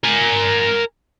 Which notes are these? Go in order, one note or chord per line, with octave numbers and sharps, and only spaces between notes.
A#4 G#5